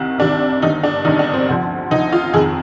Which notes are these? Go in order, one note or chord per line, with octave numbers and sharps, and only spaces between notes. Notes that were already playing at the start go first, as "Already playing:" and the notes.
Already playing: C2 C3 D#3
C2 C3 D#3 D4
G1 G2 D#3 D#4
D4
G1 G2 D#3 D#4
D4
C4
D2 D3 F3
D2 D3 F3 D#4
F4
F1 F2 D#3 G#4